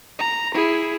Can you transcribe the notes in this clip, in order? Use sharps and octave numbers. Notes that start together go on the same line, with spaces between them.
A#5
E4 G#4